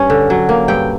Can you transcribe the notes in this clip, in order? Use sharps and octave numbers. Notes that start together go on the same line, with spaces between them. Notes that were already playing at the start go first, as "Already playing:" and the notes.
Already playing: G2 C#4
D3
F#3
A#3
G2 G5